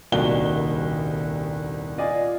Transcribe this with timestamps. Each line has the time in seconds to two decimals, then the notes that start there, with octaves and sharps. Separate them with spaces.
0.12 D#1 C2 D#3 D4 F#4 G7
1.98 F4 D5 D#5 F5 G#5